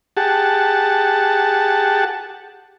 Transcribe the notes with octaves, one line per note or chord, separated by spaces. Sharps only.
G4 G#4 F#5 A5